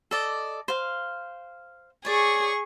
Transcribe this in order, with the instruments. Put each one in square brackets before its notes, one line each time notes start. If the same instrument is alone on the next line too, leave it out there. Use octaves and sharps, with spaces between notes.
[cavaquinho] A4 D5 D#5
C5 F5
[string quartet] G#4 C#6 [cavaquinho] C#5 D5